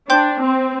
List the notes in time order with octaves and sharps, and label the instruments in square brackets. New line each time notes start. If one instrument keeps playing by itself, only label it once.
[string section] D4 [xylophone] C5 G5 C6 G6
[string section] C4